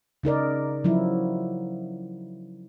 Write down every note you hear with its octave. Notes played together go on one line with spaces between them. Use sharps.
C#3 D#4 A#4 D5
F3 F#3 E4